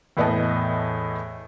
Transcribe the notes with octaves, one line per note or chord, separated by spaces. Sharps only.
E2 A2 B4 D#5 G5 A5